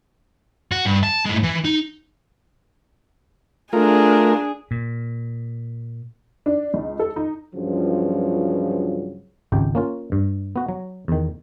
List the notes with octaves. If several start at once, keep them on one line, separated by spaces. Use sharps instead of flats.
F#4
G2
A5
A2 G#3
E3
D#4
A3 D4 F4 G#4 A#4
A#2
D4
C#2
A4
D#4
C#2 G2 C#3 F3 F#3
G#1 C#2 G4 G5
A#3 C#4 F4
G2
B3 F#4
F#3
E2 D#3